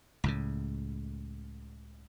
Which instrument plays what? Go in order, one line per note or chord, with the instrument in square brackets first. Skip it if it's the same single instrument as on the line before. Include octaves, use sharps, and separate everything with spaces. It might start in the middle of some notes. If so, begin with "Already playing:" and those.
[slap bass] C#2 A2 C#3